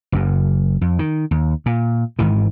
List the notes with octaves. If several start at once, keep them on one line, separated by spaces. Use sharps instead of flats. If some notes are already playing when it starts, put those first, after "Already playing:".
F#1 F#2
F2
D#3
D#2
A#2
G#1 G#2 D#3 E3